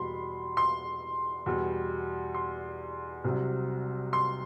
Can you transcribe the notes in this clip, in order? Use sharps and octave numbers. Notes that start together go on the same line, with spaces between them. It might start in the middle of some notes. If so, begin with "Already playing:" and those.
Already playing: E2 B2 G3 B5 C6
C6
E2 B2 G3
C6
C2 C3 F#3
C6